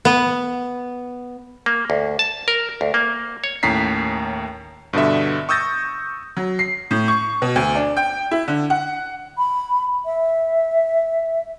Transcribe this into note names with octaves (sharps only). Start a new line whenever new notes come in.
B3
A#3
D2
A5
A#4
D2
A#3
C#5
D#2 A2 C#4 A#5 B6 C7
G2 B2 D3 E5
C#6 D#6 E6 G6 A6 A#6
F#3
C7
A2
C#6
B2
D2
D4
G5
E4
D3
F#5
B5
E5